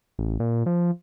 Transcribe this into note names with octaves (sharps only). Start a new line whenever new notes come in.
A1
A#2
F3